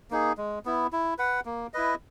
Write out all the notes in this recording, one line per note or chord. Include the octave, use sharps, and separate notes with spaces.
A#3 D#4 G#4
G#3
B3 E4
E4
B4 F#5
A#3
E4 B4 D#5